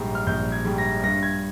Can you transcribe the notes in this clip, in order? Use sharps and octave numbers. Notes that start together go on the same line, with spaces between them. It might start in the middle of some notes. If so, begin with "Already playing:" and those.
Already playing: A#1 G#2 G3
F6
A#1 G6
G#6
G#2 G3
A#6
G2 A#6
G#6